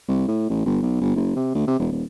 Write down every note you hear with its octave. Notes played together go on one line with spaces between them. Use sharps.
C2
A2
A1
G1
B1
G1
F#1
C3
D2
C3
E1
D#1